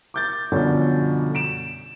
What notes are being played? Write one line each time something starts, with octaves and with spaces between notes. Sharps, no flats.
D6 G6 A6
F#2 B2 D3 F3 G3 C#4
D7 E7